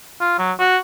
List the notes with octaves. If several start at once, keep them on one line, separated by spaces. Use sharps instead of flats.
F4
F#3
F#4